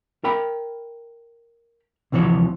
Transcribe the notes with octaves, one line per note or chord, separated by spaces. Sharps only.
A#4 G5 B5
D2 C3 E3 F3 C#5